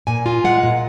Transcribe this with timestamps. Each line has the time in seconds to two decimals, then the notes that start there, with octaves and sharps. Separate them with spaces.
0.07 A#2 G#5
0.26 F4
0.44 G#3 F#5
0.63 A#2